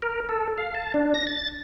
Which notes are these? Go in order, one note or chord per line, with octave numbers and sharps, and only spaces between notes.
A#4
A4
F5
A5
D4
A#6
A6